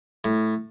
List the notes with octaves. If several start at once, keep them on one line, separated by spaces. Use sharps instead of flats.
A2